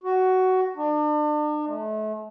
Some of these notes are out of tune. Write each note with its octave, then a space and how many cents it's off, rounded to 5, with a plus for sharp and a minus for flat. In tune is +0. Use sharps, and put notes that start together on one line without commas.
F#4 +10
D4 +40
A3 -35